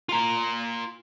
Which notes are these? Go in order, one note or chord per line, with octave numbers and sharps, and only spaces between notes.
F4 A#5